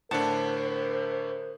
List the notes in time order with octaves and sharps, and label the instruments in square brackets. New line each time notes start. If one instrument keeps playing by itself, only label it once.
[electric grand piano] A2 D3 D4 [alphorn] A#4 [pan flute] C5 [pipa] F#5 A5